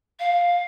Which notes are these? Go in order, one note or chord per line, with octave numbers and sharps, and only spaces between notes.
F5